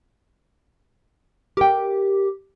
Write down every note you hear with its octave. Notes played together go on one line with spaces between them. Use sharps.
G4 A#4 G5